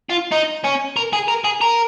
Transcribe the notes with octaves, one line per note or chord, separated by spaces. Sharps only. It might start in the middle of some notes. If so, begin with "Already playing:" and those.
F4
D#4
C#4
A#4
G#4
A#4
G#4
A#4